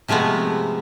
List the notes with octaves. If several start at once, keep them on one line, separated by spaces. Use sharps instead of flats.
C3 F3 G#3 A3 B3